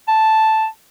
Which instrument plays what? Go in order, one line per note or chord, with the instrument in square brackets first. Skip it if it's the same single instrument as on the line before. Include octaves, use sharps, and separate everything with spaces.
[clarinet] A5